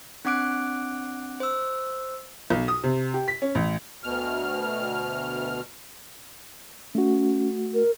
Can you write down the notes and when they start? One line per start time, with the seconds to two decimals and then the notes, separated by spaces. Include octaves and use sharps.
0.25 C4 D4 F#5 D6 F#6 D7
1.40 C5 E6
2.50 B1
2.68 D#6
2.83 C3
3.14 G4
3.28 B6
3.42 C#4
3.55 A1
4.03 D2 B2 F6
6.95 A3 C#4 F#4
7.74 A#4